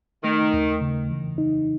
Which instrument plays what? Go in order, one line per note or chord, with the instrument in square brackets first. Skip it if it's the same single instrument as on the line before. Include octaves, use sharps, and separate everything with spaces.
[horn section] D#3 [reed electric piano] A3
[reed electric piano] D#2
C#3
E3
D#4